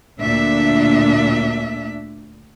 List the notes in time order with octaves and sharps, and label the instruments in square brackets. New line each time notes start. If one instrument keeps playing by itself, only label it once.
[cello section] D2 A#2 D4 E5